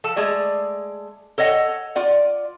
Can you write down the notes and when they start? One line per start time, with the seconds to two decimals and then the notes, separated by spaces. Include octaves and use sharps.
0.04 F3 A4 A5
0.16 G#3 A3 G#4 D5
1.38 A4 C#5 D#5 F#5
1.95 F4 D5 F#5